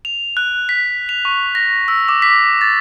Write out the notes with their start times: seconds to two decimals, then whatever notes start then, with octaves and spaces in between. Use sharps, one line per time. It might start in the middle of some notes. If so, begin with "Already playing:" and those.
0.05 F7
0.37 F#6
0.69 B6
1.09 F7
1.25 C#6
1.55 A#6
1.88 E6
2.09 D6
2.22 B6
2.61 A6